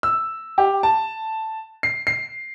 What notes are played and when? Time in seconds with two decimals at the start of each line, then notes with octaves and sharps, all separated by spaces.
0.03 E6
0.58 G4
0.83 A5
1.83 C7
2.07 C7